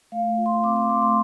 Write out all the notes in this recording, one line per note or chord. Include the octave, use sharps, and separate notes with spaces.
A3 F5
F4
C6
C4 D6
D6
A3 C6
C6